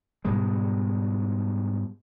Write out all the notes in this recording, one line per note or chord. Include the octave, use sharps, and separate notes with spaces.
G#2 B2 G3 G#3